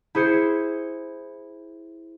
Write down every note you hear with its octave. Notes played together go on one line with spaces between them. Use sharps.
E4 G#4 C5 C#7